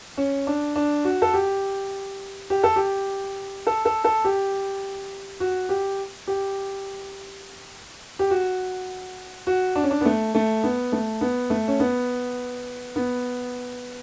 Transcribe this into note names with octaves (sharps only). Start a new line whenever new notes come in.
C#4
D4
D4
F#4
A4
G4
G4
A4
G4
A4
A4
A4
G4
F#4
G4
G4
G4
F#4
F#4
D4
C#4
D4
B3
A3
A3
B3
A3
B3
A3
C#4
B3
B3